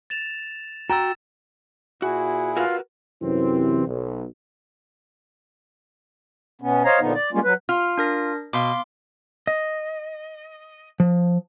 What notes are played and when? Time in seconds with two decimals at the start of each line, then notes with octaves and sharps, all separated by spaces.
0.10 A6 E7 F7
0.90 F#4 G5 A#5 E6 A6 E7
2.02 A#2 E4 F#4 G#4
2.57 F4 F#4 A#4 B4
3.22 F#2 C3 E3 C4
3.87 B1
6.62 B2 B3 C#4
6.85 C5 C#5 D#5 F5 A#5
7.00 A#2 D3 F3 B3 D#4
7.15 D5
7.33 G3 G#3 A#3 C#4 F4
7.44 F#3 B4
7.69 F4 F6
7.98 D4 A#4 A#6
8.53 B2 F5 C6 D6
9.47 D#5
11.00 F3